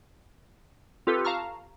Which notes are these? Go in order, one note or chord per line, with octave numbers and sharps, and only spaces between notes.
C4 F4 G4 A4 B4
F5 A5 A#5 C#6 F6